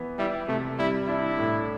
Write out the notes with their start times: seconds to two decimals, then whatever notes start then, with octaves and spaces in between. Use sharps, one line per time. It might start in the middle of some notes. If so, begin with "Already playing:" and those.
Already playing: E3 B3
0.18 G3 E4
0.48 C3 A3
0.78 G3 E4
1.08 D4 E4
1.38 A2